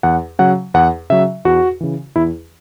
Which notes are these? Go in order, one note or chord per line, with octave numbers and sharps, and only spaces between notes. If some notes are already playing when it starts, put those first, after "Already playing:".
E2 F#5
C#3 F#3 F#5
E2 F#5
C#3 F#3 E5
E2 F#4
C#3 E3
E2 E4